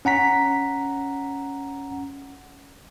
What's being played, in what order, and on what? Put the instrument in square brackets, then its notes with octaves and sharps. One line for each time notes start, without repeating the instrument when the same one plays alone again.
[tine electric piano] C#4 F#5 A#5 B6